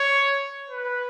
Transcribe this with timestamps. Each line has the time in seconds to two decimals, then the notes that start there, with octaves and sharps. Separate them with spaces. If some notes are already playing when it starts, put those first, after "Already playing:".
Already playing: C#5
0.70 B4